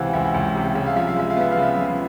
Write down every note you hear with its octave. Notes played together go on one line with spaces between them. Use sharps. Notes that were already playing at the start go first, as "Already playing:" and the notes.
Already playing: C#2 C3 E3 C5 F5 F#5
C#2 E5
C#2
C3
C#3 E5
F5
F3 E5
F5
G#3 E5
F5
B3 E5
F5
C#3
E5
F3